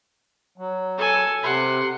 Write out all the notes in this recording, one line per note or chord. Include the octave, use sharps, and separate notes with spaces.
F#3
A4 G#5
C3 F#5 C6